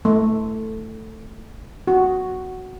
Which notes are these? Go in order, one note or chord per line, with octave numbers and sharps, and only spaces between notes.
A3
F#4